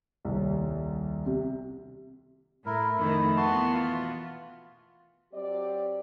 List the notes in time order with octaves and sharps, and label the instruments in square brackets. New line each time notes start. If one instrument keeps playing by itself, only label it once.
[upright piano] D#1 C2
[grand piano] C3
[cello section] A2 [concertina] E4 A#4
[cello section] F2 D#3 A3 [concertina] E4
[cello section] B2 E3 B3 [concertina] F#4 A5 C6
[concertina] F4
[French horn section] F#3 C4 G4 D5